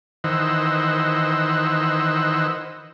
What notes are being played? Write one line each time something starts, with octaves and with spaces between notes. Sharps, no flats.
D#3 E3 C5 D#5 F#5 E6